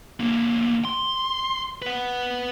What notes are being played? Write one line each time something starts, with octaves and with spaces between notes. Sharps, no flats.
D3 A#3
C6
B4 F#5